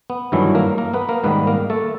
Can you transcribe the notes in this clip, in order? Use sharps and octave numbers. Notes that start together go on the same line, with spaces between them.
B3
G2 D#3 E3 F#3 A3 E4
A#3 A#4
A#3 A#4
B3 B4
A#3 A#4
G#2 D#3 G3 B3 B4
A#3 A#4
A3 A4